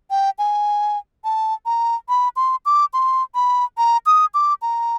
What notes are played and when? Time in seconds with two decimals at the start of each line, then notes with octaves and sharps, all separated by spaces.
0.10 G5
0.39 G#5
1.24 A5
1.66 A#5
2.09 B5
2.36 C6
2.66 D6
2.93 C6
3.35 B5
3.78 A#5
4.06 D#6
4.34 D6
4.62 A#5